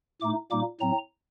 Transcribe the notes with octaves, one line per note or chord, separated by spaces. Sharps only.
A2 A3 D#4 D6
A#2 G3 A#3 D#4 D6
A2 F#3 C4 A#5